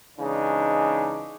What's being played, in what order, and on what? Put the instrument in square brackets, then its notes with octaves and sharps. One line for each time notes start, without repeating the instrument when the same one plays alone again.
[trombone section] C#3 E3 G#3 D4 D#4